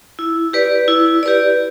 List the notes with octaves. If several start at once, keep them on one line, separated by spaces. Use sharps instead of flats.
E4
G4 B4 D5
E4
G4 B4 D5